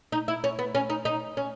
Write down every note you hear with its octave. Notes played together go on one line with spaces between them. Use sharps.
D#4
E4
C#4
B3
C#4
D#4
D#4
C#4